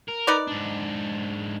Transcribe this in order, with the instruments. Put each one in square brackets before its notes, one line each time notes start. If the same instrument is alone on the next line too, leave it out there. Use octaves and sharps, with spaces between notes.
[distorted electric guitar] A#4
[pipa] D#4 B4 D5
[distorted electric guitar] G#2 D4